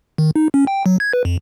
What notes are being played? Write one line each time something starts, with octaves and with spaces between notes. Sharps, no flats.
D#3
D#4
C#4
G5
F#3
G#6
B4
F2